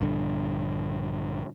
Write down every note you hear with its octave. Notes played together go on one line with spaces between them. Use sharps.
A#1 G2 D3